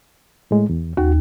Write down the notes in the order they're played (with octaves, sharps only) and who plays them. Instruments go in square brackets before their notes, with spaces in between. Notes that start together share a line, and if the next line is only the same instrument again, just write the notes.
[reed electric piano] A2 G#3
E2
[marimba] D#2 [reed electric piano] F#4